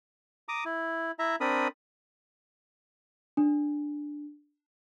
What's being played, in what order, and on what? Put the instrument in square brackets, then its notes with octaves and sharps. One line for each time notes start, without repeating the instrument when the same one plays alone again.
[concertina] A#5 D6 D#6
E4
E4 E5 A#5
C4 D4 A#4 B5 D#6
[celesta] D4